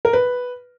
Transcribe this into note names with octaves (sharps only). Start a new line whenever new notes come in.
A#4
B4